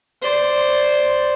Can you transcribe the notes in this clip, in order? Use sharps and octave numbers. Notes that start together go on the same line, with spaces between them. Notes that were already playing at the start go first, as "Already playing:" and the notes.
C5 D5